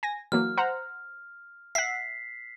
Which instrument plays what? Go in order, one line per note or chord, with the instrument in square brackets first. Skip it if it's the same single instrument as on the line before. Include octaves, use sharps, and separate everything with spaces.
[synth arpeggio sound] G#5 A#6
[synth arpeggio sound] E3 F#3 A#3 [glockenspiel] F6
[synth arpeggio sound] C5 F#5 A#5
[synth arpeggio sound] E5 F#5 [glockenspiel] B6 C7